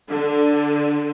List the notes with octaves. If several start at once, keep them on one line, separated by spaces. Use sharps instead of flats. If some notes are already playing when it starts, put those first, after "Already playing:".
D3